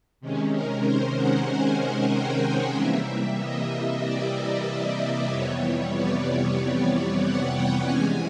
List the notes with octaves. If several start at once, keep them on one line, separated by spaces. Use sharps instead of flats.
C3 D#3 G#3 C#4
A#4
C5
F#5
G#5
G5
F#5
C3 E3 G3 A#3 E5
D#5
D5
F2 C3 E3 G3 B3 C#5
D5
F#5
G5
C3 E3 G#3 C#4 G#5